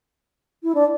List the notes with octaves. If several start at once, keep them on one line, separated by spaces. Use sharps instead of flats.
E4
D4